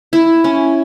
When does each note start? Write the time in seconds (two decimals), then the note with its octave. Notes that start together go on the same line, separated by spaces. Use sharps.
0.13 E4
0.44 C#4